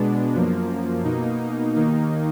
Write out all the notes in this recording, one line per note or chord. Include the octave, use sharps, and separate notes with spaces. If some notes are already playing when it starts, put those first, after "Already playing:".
Already playing: B2 G#3 B3 D4
F#2 F3 A#3
B2 A#3 D#4
D#2 D#3 A#3 D#4